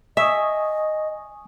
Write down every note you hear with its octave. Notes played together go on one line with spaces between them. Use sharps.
D#5 E5 G#5 C#6 D#6